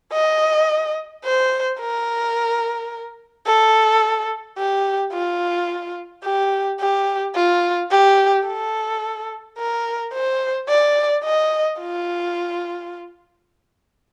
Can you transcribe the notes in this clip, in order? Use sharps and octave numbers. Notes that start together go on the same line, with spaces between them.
D#5
C5
A#4
A4
G4
F4
G4
G4
F4
G4
A4
A#4
C5
D5
D#5
F4